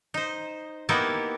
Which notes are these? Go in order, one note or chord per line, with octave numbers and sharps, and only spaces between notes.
D#4 C5
A#3 B3 D#4 E4 F#4 G4